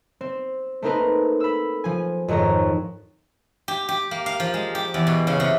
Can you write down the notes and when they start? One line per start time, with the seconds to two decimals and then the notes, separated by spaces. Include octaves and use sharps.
0.21 C4
0.82 A3 A#3 C4 D#4 A#4 B4
1.40 B5 E6
1.84 F3 G#5
2.28 F2 G#2 D#3 C#5 A#5
3.68 G4
3.89 G4
4.11 A#3
4.26 F5
4.40 F3
4.54 G#3
4.75 G4
4.94 E2
5.07 B2
5.27 C#3
5.40 C3